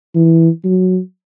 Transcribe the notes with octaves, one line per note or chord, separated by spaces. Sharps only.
E3
F#3